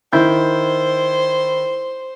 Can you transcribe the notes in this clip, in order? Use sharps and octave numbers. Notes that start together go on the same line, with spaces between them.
D#3 E4 C5 G6